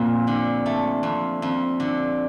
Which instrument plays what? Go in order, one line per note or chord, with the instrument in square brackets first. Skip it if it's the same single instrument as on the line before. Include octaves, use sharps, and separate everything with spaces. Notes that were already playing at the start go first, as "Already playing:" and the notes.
Already playing: [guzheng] F2 [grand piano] A#2
[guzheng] D3
A3
F2
F2
D3